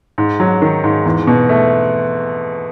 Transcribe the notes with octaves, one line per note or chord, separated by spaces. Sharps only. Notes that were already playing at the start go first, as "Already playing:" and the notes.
G#2
F#3
D#3
G#2
E2
B2
A3